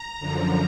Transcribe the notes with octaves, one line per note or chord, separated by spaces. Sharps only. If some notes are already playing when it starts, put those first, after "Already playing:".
Already playing: A#5
F#2 D3 F3